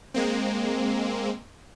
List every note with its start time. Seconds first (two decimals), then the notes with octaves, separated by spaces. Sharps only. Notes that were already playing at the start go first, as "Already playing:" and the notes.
0.14 G#3 A#3 C4